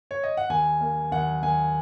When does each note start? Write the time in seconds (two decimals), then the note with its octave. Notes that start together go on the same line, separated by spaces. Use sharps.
0.11 C#5
0.24 D#5
0.37 F#5
0.49 D#2 G#5
0.81 A#3
1.11 D#2 F#5
1.42 D#2 G#5